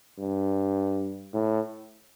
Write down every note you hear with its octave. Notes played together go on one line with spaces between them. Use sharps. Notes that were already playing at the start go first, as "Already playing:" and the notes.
G2
A2